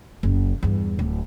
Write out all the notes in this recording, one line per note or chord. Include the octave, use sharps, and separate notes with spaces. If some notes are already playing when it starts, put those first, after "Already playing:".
F#1
E2 G2
D1